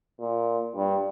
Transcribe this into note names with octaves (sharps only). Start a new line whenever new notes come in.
A#2
G2